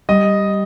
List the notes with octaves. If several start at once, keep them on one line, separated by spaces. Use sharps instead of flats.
G3 D#5